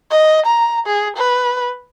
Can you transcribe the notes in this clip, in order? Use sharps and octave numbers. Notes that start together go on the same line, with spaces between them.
D#5
A#5
G#4
B4